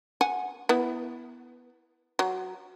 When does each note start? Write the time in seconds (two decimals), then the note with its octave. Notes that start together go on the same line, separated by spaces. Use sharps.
0.21 F#5 G#5
0.69 B3 E4
2.19 F#3